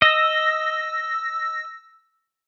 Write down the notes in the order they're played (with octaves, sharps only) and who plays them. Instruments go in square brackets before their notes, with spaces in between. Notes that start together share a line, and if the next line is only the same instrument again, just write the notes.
[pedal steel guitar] D#5 [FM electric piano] E6 A#6